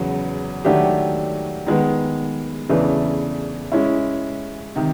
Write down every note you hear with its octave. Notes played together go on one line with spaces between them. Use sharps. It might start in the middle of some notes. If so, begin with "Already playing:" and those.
Already playing: E2 C#3 F#3 B3
D#3 F#3 A3 D4 G4
D#3 G#3 B3
E2 C#3 E3 A3 D4
G#3 C#4 E4
C3 D#3